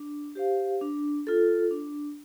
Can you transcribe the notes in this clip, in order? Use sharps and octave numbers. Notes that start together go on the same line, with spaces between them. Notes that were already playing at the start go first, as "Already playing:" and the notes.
Already playing: D4
G4 C5 F5
D4
F4 A4
D4